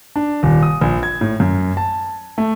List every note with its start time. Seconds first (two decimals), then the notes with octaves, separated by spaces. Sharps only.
0.16 D4
0.43 D#1
0.63 D#6
0.81 A#1
1.03 G#6
1.21 A2
1.40 F#2
1.77 A5
2.38 A3